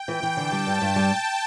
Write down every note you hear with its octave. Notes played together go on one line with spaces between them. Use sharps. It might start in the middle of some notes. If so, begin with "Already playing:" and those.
Already playing: G5
E3
E3
D3 A5
G3
G2
G2
G3